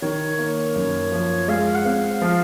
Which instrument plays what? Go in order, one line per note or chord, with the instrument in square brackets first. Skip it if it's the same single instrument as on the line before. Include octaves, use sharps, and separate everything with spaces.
[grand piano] D#3 [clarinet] C#5
[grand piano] A#3
F#2
F3
[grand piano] G#3 [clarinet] F5
[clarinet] F#5
[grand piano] C4 [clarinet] F5
[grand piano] F3